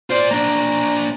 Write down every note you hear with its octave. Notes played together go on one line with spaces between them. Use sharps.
F4 C5 D5
A#3 D4 A#5